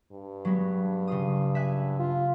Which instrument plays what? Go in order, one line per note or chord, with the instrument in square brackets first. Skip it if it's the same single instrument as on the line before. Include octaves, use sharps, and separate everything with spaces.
[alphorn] G2
[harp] F#3 G#3 B3
C#3 F4 D#6
E5 G#5 F#6
[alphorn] F4